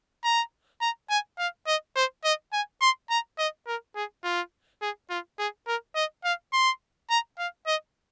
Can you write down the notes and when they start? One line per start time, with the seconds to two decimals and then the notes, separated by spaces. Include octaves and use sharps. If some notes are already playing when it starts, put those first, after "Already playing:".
0.25 A#5
0.81 A#5
1.10 G#5
1.39 F5
1.67 D#5
1.96 C5
2.24 D#5
2.53 G#5
2.82 C6
3.10 A#5
3.39 D#5
3.67 A#4
3.96 G#4
4.24 F4
4.82 G#4
5.10 F4
5.39 G#4
5.67 A#4
5.96 D#5
6.24 F5
6.53 C6
7.10 A#5
7.39 F5
7.67 D#5